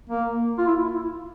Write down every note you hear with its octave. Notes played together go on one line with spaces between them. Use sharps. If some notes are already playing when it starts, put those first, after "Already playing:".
A#3
F4
E4